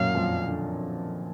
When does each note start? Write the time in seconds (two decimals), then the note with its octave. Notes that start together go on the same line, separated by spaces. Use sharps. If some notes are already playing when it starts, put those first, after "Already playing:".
Already playing: F#2 A#2 F#3 F5
0.15 F2 F3
0.47 D3